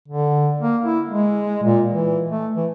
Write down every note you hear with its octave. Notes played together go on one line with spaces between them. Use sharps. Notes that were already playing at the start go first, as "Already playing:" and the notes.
D3
A#3
E4
G#3
A#2
E3
A3
E3